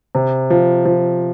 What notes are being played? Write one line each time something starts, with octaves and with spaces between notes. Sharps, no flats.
C3
F3
F3